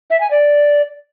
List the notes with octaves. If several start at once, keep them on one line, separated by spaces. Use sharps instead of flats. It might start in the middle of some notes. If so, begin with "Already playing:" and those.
E5
G#5
D5